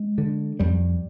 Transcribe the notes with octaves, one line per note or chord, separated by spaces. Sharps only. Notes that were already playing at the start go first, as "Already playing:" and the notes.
Already playing: G#3
D3
F2 G3